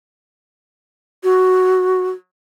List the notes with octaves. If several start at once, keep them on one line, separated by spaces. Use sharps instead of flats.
F#4